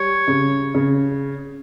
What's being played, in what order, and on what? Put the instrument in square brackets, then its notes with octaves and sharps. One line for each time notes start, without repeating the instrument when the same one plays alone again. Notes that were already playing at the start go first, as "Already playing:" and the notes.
Already playing: [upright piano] G3 [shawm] C#5
[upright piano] C#3
C#3